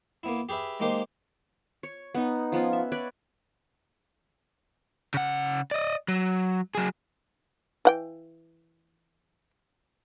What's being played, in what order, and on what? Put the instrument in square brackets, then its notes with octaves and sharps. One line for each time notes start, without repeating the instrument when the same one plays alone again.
[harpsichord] A#3 B3 E4
G4 G#4 B4 E5
G#3 A#3 D#4 G4 A#4 C5
[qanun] C#5
B3 D#4
F3 B3 C#4 F4
E5
B4 C#5 D5
[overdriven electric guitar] C#3 F#5
D5 D#5
F#3
F#3 G#4
[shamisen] E3 F#5 G5